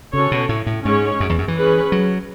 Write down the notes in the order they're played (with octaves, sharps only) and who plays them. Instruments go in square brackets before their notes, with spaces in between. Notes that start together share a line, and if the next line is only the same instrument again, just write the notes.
[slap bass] C#3 [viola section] C#4 F#4 A4 C#5
[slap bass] B2
A2
A2
[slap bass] G#2 [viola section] G#3 C#4 G#4 C#5
[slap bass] F#2
E2
F#2
E3
[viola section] C#4 G#4 B4
[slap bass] F#3